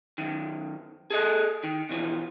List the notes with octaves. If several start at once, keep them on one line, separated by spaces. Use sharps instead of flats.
F#2 D#3
G#4 A4 D#5
D#3
B2 E3 F3